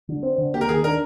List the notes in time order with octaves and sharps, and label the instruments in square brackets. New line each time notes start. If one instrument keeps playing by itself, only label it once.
[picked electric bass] D3
C4
D3
[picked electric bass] A#3 [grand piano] G4
[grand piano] A#4
[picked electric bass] D#3 [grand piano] G#4
[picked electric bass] D4 [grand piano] A#4